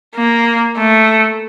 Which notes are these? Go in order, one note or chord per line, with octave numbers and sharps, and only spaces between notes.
A#3
A3